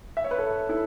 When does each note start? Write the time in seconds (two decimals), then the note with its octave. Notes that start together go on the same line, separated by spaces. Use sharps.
0.17 E5
0.24 C#5
0.31 B4
0.38 A4 C#5
0.69 E4 A4